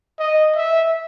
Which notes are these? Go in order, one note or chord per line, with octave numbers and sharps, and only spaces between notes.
D#5
E5